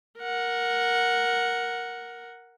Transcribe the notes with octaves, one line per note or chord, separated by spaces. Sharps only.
A#4 F#5